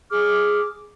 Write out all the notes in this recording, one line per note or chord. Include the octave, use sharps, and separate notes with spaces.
G#4 D6 F6